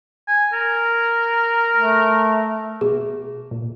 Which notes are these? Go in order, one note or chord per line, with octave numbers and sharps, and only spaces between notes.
G#5
A#4
A3
B2 G#4
A#2